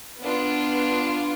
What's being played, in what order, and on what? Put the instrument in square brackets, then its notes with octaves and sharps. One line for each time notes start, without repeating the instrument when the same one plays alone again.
[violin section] B3 D4 F4